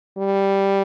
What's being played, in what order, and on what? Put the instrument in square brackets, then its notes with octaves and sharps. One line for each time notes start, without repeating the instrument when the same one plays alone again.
[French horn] G3